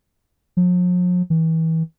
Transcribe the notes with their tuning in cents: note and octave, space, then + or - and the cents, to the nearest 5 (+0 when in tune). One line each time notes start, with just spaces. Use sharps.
F3 +45
E3 -30